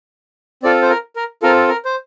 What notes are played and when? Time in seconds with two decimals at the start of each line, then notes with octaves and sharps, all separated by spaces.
0.63 C4 F4 A4 D5
0.82 C5
0.90 A#4
1.16 A#4
1.43 C4 F4 A4 A#4
1.69 A#4
1.85 C5